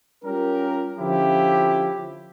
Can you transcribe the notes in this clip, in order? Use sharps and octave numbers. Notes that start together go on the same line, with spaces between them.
G3 C#4 F4 G4 A#4
D3 F3 C#4 E4 F4 G4